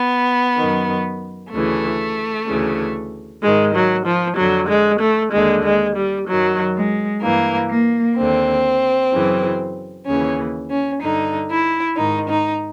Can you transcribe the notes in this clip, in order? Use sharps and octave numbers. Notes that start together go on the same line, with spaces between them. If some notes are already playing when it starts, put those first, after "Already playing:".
Already playing: B3
F#2 D#3
D2 C#3 E3 A3
D2 C#3 E3
G#2 D#3 G#3
F#3
F3
F2 D3 F#3
G#3
A3
D#2 D3 G#3
G#3
G3
F#2 D#3 F#3
G#3
G2 E3 A#3
A#3
D#2 D3 C4
F#2 C#3 E3
D#2 C#3 E3 C#4
C#4
G2 D3 D#4
E4
G#2 D#3 D#4
D#4